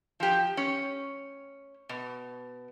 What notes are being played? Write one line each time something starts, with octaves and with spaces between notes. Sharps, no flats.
F3 G4
C#4
B2